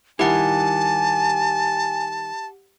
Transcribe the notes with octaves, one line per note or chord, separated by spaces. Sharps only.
D#3 G3 E4 G4 F#5 G#5 A5